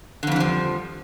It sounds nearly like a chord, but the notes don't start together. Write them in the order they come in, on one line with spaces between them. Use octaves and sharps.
D3 F2 E3 G3 F3